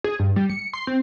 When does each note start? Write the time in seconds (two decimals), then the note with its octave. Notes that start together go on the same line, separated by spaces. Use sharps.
0.04 G#4
0.19 G2
0.36 G3
0.49 C#7
0.74 C6
0.87 C4